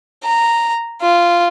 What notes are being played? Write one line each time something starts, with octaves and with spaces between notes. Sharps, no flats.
A#5
F4